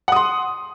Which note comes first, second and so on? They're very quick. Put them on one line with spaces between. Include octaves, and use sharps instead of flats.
F#5 D#6 C6